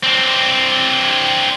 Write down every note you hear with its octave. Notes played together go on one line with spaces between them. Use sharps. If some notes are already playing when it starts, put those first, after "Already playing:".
C4 D4